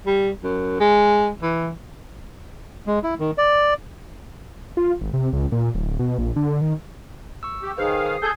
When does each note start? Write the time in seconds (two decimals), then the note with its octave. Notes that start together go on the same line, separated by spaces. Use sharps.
0.06 G3
0.44 F#2
0.80 G#3
1.42 E3
2.87 G#3
3.04 E4
3.20 D#3
3.38 D5
4.77 F4
5.01 G#1
5.13 C3
5.33 C#2
5.52 A#2
5.75 D1
5.99 B2
6.18 A#1
6.36 D3
6.61 D#3
7.43 C#6 E6
7.63 G4
7.78 D#3 G#4 B4 C5 F5
8.06 D#6 C7
8.22 G#4 A4 G#5 D#6 G6 G#6